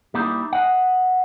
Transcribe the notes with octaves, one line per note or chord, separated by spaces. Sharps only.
G3 A#3 D#4 E4
D#5 F#5